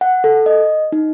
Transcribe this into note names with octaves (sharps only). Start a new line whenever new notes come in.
F#5
A4
D#5
D#4